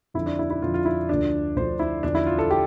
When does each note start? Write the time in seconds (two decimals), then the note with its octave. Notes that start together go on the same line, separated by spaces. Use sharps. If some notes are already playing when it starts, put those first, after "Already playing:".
0.14 F2 D3 F3 E4
0.26 D4
0.39 E4
0.50 E4
0.62 F2 D3 F3 F4
0.74 F4
0.85 E4
1.09 D2 D3 F3 D4
1.56 D2 D3 F3 C5
1.79 E4
2.03 E2 D3 F3 D4
2.15 E4
2.27 F4
2.39 A4
2.51 G4